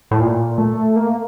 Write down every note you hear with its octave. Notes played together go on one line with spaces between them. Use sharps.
A2
A#2
A3
A#3